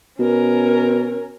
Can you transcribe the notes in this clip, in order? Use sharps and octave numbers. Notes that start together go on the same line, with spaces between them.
B2 C#4 A#4